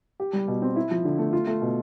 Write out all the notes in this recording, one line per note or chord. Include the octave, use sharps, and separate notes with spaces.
G4
G3
B2
C4
E4
F3
D3
A3
F4
A3
B2